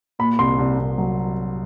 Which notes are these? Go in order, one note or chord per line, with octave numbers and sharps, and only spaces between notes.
A#2 B5
C2 C6
C2
C2
F#3